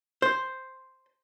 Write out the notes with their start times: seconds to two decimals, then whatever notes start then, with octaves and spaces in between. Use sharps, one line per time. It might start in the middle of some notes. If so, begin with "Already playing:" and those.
0.22 C5